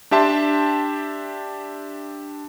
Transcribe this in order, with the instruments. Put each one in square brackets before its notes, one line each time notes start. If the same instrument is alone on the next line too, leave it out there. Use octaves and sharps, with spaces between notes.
[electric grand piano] D4 G4 E5 A5 C6